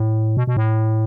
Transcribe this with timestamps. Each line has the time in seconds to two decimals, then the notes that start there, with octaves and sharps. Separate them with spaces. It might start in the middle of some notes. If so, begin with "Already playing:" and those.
Already playing: A2
0.37 B2
0.47 B2
0.57 A2